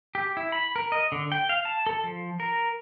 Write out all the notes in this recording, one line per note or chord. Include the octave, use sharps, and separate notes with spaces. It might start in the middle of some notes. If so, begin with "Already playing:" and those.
G4
E4
B5
A#4
D#5
D3
G5
F5
A5
A4
F3
A#4